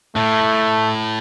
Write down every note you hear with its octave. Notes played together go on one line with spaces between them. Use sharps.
A2 A3